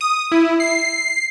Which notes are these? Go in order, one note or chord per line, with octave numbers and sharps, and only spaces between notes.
D#6
E4
C7